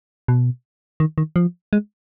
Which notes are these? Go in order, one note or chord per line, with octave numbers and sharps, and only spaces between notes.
B2
D#3
D#3
F3
G#3